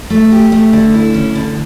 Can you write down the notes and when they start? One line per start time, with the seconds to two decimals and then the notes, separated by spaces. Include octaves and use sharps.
0.10 A3
0.32 G4
0.52 A3
0.73 D3
0.94 E4
1.14 C#4
1.35 D3